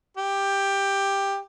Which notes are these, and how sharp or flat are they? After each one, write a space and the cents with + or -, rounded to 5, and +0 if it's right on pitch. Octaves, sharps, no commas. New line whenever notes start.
G4 +10